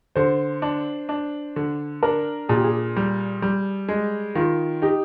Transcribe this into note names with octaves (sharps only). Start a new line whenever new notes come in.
D3 C5
D4
D4
D3
D4 A#4
A#2 G#4
G4
G#4
G3
G3
G#3
D#3 F4
D#4 G4